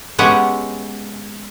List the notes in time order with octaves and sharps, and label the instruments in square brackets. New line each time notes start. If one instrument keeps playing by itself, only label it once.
[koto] G#3 B3 C#4 G4 E5 F#5